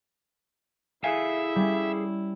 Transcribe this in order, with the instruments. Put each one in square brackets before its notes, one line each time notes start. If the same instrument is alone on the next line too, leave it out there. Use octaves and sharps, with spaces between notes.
[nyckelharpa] E4 [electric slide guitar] G#4 A4 F5 [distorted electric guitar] E5 [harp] G#5
[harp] G3 C#4